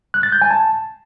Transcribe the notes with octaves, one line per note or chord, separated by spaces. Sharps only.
F#6
A6
G6
G#5
A5